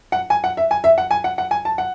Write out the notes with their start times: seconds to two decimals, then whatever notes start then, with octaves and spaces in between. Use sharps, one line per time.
0.12 F#5
0.30 G#5
0.44 F#5
0.57 E5
0.71 G#5
0.84 E5
0.98 F#5
1.11 G#5
1.24 F#5
1.38 F#5
1.51 G#5
1.65 A5
1.78 F#5